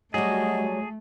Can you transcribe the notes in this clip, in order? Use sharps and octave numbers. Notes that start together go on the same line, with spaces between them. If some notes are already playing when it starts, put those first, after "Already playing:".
F#3 G3 A3 F#4 G#4 D#5